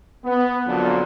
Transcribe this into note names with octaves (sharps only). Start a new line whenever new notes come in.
B3
F2 A#2 D3 F3 F#3